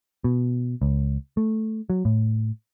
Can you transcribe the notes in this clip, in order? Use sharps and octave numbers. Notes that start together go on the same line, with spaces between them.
B2
C#2
A3
F#3
A2